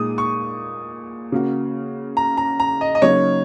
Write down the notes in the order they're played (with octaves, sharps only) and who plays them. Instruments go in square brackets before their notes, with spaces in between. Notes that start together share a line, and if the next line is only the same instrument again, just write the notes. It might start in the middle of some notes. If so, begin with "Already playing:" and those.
Already playing: [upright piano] A#2 G#3 D#4 G#4 [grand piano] D#6
[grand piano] C#6
[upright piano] C#3 A#3 F#4
[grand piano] A#5
A#5
A#5
D#5
D#5
[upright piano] C#3 F#3 A#3 D#4 [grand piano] C#5